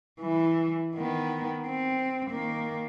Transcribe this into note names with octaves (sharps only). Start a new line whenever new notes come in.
E3
D#3 B3
C4
D#3 A#3